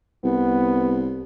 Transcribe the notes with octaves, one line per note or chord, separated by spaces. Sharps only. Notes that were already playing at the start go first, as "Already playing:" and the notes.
C2 B3